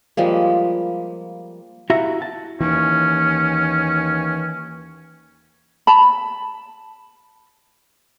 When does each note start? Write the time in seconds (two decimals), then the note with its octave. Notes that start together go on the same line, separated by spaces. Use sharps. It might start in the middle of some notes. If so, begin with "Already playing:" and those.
0.17 F3 G3 G#3 A#3
1.90 E4 F#4 G4 E5 F5 A#5
2.22 A5
2.61 D#2 E3 C#4
5.87 A5 B5